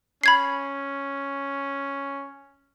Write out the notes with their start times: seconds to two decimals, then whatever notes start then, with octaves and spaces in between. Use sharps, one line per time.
0.24 C#4 B5 G#6 C7